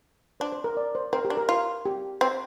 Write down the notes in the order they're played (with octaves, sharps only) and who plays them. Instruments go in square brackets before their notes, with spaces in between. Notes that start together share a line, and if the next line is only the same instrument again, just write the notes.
[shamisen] D4 [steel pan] C5
[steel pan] C5
A#4
D5
C5
[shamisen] C4 [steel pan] A#4
[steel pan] G4
[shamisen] D4
[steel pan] A#4
[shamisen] F4
[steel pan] G4
[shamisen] C4